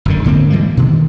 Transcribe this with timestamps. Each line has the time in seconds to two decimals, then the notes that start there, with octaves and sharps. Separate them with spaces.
0.05 F#1 F#2 D3
0.24 G#2 D3 A#3 C4
0.50 E3 G3 G#3 A#3
0.77 B2 D#3